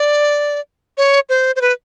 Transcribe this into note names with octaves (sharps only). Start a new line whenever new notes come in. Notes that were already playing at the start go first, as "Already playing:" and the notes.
Already playing: D5
C#5
C5
C5
B4